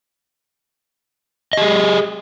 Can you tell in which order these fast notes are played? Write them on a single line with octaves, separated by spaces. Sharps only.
D#5 G4 G#4